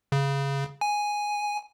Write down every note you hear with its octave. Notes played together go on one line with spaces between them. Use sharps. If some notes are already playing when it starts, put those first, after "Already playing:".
C#3
G#5